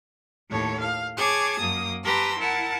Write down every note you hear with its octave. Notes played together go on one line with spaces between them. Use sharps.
D#2 A2 A4 C#5
F5
G#4 C#5 A5 D6 G#6
F#2 A#3 D#6
G4 B4 A5 A#5 C6 E6
E4 A#4 F#5 A5